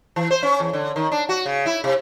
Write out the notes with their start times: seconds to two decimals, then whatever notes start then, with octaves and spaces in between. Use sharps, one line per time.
0.16 E3
0.31 C5
0.43 C#4
0.60 E2
0.73 D3
0.96 D#3
1.12 D4
1.29 F#4
1.46 C#3
1.66 E4
1.84 C3